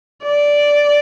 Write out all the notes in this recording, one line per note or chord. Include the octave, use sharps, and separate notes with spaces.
D5